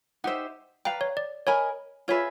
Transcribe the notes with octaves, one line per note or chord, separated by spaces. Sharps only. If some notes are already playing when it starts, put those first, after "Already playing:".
D#4 G4 C5 E5 F#5
B4 D5 F5 G5 A#5
C#5
D5
A#4 C#5 D#5 G#5 B5
F4 G#4 B4 C#5 E5